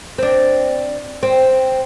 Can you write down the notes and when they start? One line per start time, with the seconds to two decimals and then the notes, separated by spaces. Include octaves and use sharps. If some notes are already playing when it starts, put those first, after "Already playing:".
0.18 C4 D4
1.23 C4